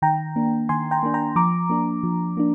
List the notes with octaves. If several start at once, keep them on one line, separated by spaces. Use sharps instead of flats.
D#3 G5 A#5
A#3 D4
D#3 G#5 C6
G5 A#5
A#3 D4
G5 A#5
F3 A#5 D6
A#3 D4
F3
A#3 D4